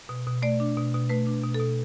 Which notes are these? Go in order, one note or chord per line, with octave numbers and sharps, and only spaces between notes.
B2
B2
A3 D5
D4
B2
B2
A3 B4
D4
B2
A4
B2